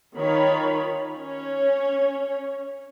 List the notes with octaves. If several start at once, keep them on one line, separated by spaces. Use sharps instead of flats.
D#3 F4 A#4 C#5 B5
C#4 C#5